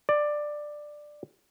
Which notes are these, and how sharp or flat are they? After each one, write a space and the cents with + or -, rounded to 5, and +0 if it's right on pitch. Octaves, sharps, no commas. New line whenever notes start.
D5 +10